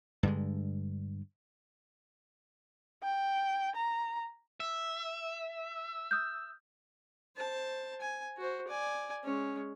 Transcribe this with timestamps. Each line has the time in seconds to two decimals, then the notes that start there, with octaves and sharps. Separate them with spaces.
0.23 G2 D3 G#3
3.03 G5
3.75 A#5
4.60 E5
6.11 D#6 F6 G6
7.37 C5 A5
8.01 G#5
8.37 F#4 C5
8.67 D5 G#5
9.24 G#3 C#4